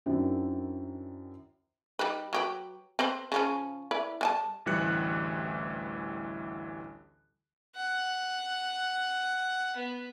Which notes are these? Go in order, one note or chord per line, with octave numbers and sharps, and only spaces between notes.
F#2 D#3 C4 D4 E4
G3 D#4 B4
F#3 G4 B4
C4 B4 C5
C#3 F3 C#4
E4 B4 D5
G3 G#5 A5
A1 D2 E3 G3 F#6 C#7
F#5
B3